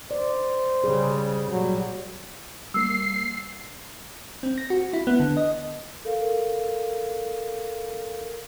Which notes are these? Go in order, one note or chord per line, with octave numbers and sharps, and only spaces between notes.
C5 D5
C#3 G3 G#4
A#2 F#3 G3
G3 A#3 E6 C7
C4
A#6
F#4
E4
B3
D3
D#5
A4 A#4 F5